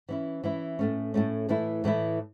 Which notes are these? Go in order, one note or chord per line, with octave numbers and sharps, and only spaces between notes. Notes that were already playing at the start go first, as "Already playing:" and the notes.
E3 C#4 E4
E3 C#4 E4
A2 A3 C#4
A2 A3 C#4
A2 E3 A3 E4
A2 E3 A3 E4